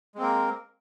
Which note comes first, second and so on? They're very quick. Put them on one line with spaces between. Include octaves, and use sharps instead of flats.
G#3 C4 A#3 A#4